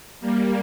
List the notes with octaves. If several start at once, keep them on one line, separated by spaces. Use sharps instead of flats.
G3 A#3